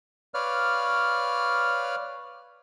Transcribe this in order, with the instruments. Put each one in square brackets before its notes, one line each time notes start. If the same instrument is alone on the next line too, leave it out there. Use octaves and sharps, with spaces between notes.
[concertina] B4 C#5 D5 F5 F6